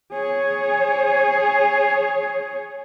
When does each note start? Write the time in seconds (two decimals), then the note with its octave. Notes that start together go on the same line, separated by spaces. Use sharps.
0.13 G#4 C#5